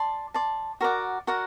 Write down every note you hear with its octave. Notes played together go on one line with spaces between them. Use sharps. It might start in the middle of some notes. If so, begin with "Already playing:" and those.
Already playing: D5 A5 C6
D5 A5 C6
F#4 A#4 D5 F#5
F#4 A#4 D5 F#5